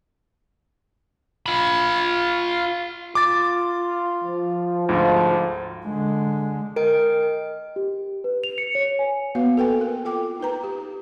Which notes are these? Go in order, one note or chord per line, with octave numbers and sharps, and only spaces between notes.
F4 B5
F4 D6 A6
F3
D2 G#2 F3
D3 G#3
A#4 D#5 G5 D7
G4
B4
F7
C#7
C#5
G#5
A#3 B3 F#4 B4 F5
A4 B4 G5 G#5
C4 A#4
F4 A4 G5 D6
D#4 A#4 B4 A#5
G4